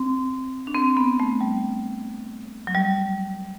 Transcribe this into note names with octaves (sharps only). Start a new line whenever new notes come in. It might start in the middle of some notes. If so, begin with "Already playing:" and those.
Already playing: C4
D4
C4
B3
A3
G3
F#3
G3